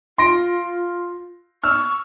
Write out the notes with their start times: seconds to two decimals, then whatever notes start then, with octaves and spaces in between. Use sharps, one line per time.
0.18 F4 C6 A#6 D7
1.64 C#6 E6 F6